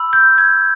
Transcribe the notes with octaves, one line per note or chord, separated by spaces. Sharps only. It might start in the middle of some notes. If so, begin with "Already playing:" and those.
Already playing: B5 E6
G6
G#6